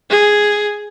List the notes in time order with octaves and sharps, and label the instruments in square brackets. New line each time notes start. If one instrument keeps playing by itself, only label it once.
[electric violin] G#4